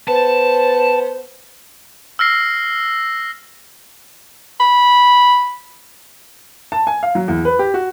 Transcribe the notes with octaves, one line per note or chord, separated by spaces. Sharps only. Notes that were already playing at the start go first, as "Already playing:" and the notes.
B3 C5 A5
E6 F6 A#6 C7
B5
A5
G#5
F5
F#3
E2
B4
G4
F#4